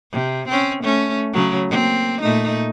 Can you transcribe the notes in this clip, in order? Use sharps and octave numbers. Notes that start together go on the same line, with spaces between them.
C3
C4 C#4
A3 C#4
C#3 F#3
A#3 C4
A#2 A3 D#4